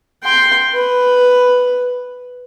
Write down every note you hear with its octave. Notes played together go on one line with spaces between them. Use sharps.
G5 C6
B4